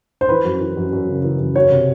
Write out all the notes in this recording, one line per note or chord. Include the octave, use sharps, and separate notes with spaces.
C5
E3 B4
F#2
E3
F#2
F#2
C#3
E3
F#2
F#3 C#5
C3